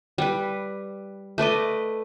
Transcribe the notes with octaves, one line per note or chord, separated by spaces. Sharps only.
G3 B4
A3 B4 D5 D#5